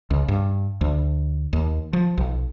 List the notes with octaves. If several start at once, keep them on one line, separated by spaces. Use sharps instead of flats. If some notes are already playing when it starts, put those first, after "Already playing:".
C#2
G2
D2
D#2
F3
B1